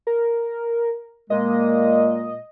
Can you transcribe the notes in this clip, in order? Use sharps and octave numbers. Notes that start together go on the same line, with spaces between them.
A#4
A#2 G#3 A#3 D#5